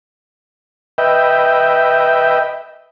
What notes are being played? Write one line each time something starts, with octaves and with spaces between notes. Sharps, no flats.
B4 D#5 E5 G5